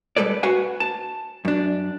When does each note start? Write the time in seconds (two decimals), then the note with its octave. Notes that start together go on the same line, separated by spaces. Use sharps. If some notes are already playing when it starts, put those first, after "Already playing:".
0.17 G3 G#3 A4 B4 D5
0.43 F#4 B4 F5 F#5 G#5
0.80 A5
1.45 F#2 D4